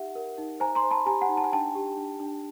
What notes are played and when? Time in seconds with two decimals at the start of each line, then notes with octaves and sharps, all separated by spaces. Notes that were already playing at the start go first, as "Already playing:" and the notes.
Already playing: D#4 G4 E5 F#5
0.15 A#4
0.38 D#4
0.60 C5 G#5 A#5
0.75 A#5 C6
0.83 C5
0.91 A5 B5
1.06 G4 G#5 A#5
1.21 F#5 G#5
1.29 D#4
1.37 A5
1.44 G#5
1.52 D4 G5 A5
1.75 G4
1.97 D4
2.20 D4